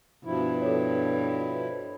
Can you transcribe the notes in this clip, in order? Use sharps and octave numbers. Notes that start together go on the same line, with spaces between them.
G2 B2 F3 E4
A4 C#5